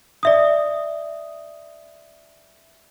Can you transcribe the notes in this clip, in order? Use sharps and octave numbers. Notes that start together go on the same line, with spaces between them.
D5 E5 D#6